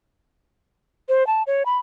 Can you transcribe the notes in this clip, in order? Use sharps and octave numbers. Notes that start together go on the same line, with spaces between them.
C5
A5
C#5
B5